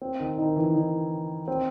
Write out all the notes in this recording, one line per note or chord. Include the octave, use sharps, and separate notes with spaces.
C4
D#3 D#4
D#3 D#4
E3 E4
D#3 D#4
C4